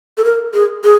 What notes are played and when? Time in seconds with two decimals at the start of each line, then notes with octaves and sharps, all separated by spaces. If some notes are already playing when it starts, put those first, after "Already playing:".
0.18 A4
0.24 A#4
0.54 G#4
0.84 G#4